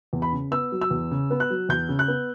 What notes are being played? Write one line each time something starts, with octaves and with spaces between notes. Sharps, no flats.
E2
B5
C#3
B3 E6
F#3
E6
E2
C#3
B3
F#6
F#3
E2 G6
C#3
F#6
B3